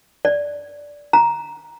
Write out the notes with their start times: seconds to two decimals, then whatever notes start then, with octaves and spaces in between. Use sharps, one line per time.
0.25 D5
1.13 A#5